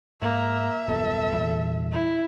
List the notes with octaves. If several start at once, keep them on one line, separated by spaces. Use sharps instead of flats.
G#2 A#3 E5
D#1 F#2 B3 A4
E2 A#2
E4